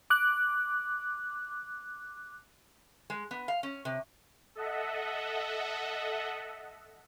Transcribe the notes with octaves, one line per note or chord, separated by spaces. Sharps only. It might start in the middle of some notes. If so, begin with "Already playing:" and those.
D6 F#6
G#3
B3
F5
C#4
C3
A4 D#5 E5 F#5